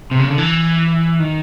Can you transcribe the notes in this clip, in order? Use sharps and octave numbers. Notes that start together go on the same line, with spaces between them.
C3
C#3
D3
E3
D#3